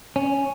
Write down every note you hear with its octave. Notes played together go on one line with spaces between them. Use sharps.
C#4